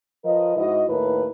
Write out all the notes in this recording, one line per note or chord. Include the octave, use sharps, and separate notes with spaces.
F3 A#4 B4 D#5
G#2 E4 F#4 D#5
D#2 A2 E4 A#4 B4